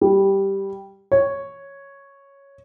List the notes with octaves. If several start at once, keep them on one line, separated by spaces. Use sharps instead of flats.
G3
C#5